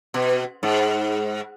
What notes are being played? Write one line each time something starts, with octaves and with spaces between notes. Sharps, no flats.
B2
G#2